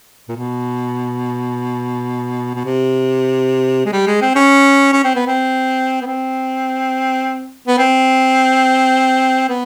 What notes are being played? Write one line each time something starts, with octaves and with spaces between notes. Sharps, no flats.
A#2
B2
B2
C3
G#3
G3
G#3
C4
C#4
C#4
C4
B3
C4
B3
C4
B3
C4
B3